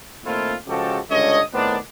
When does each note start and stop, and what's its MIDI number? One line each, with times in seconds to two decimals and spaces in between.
0.24 0.54 46
0.24 0.54 51
0.24 0.54 57
0.24 0.54 60
0.24 0.54 64
0.24 0.54 65
0.67 0.99 49
0.67 0.99 53
0.67 0.99 56
0.67 0.99 66
0.67 0.99 67
0.67 0.99 69
1.09 1.39 37
1.09 1.39 43
1.09 1.39 50
1.09 1.39 61
1.09 1.39 73
1.09 1.39 75
1.53 1.76 45
1.53 1.76 51
1.53 1.76 59
1.53 1.76 60
1.53 1.76 62